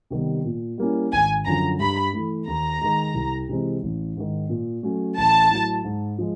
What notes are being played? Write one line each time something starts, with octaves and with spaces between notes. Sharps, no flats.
C3 D#3 G3 B3
A#2
G3 A#3 C#4 E4
G#1 G#5
F#2 D3 F3 A#5
G2 B5
E3 A3
D#2 A#5
D#3 G#3
C2
C3 E3 G#3 C4
A1
G#2 D#3
A#2
F#3 A3 C#4
A1 A5
A2 F#3
G#2
F3 G#3